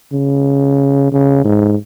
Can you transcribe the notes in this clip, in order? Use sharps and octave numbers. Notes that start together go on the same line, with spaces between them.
C#3
C#3
G#2